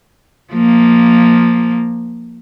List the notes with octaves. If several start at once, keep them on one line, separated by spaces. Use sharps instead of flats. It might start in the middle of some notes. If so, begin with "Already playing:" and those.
F3 A#3